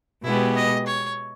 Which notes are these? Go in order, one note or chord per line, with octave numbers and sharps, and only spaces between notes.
B2 G#3 B3 E4 G4
D#5
C#5